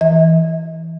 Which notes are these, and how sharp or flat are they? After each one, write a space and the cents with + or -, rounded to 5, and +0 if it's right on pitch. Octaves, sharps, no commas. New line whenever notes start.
E3 +0 D#5 +45